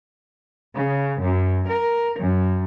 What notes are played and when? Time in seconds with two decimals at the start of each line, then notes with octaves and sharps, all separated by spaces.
0.74 C#3
1.20 F#2
1.65 A#4
2.20 F#2